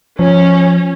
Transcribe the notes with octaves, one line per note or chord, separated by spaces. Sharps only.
F3 C#4